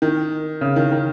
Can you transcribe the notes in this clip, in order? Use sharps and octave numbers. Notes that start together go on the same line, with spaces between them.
D#3
C#3
D#3
D#3